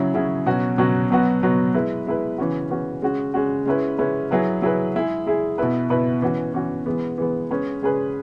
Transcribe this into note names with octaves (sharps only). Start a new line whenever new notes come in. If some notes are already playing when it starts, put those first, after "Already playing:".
Already playing: C#3 F#3 C#4 E4 G#4
C#3 F#3 C#4 E4 G#4
B2 F#3 C#4 F#4
B2 F#3 C#4 F#4
B2 F#3 B3 F#4
B2 F#3 B3 F#4
G#3 E4 B4
G#3 E4 B4
C#3 E3 C#4 F#4
C#3 E3 C#4 F#4
C#3 G#3 C#4 F#4
C#3 G#3 C#4 F#4
G#3 C#4 E4 B4
G#3 C#4 E4 B4
F#3 E4 G#4 B4
F#3 E4 G#4 B4
G#3 E4 G#4
G#3 E4 G#4
B2 B3 E4 B4
B2 B3 E4 B4
E3 C#4 F#4
E3 C#4 F#4
E3 G#3 B3
E3 G#3 B3
G#3 C#4 G#4 B4
G#3 C#4 G#4 B4